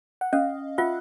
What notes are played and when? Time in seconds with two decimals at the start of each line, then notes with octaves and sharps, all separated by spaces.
0.21 F#5
0.33 C#4 D#5 F5
0.78 F4 E5 F#5